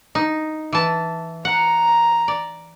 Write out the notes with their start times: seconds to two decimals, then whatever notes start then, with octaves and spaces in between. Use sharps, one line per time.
0.15 D#4
0.72 E3 A5
1.45 F#5 A#5
2.28 D5